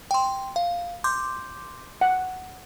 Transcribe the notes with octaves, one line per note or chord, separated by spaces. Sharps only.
G5 C6
F5
C6 D6 G6
F#5